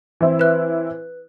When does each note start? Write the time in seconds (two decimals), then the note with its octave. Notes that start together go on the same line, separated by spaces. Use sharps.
0.21 E3 C4 E4
0.39 B4 F#6